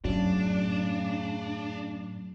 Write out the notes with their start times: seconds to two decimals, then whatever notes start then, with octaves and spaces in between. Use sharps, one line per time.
0.05 F#2 A2 C#3 F#3 D4